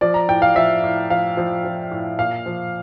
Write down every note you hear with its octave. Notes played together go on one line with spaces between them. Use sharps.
F3 D5
A#5
A2 G5
F5
F3 E5
A2
F3 F5
F3
F3
A2
A#2 F5
F3